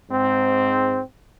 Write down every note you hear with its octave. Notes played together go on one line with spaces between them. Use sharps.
G#2 C4